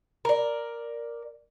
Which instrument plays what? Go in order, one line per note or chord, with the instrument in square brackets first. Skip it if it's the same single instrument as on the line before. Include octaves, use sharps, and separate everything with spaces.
[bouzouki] A#4 D5